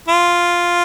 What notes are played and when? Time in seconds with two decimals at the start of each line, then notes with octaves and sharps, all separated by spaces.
0.09 F4